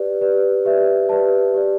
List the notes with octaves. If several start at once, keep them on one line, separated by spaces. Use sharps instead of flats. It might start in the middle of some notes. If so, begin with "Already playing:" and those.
Already playing: G4 B4 D5
G4 B4 D5
G4 B4 D5 E5
G4 B4 D5 A5
G4 D5